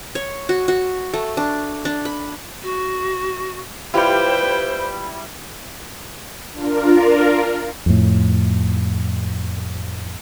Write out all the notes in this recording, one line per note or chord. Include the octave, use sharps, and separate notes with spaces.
C#5
F#4
F#4
A3
D4
D4
B5
F#4
G3 E4 F4 G4 B4 C5 G5
D4 F4 A#4
F2 A2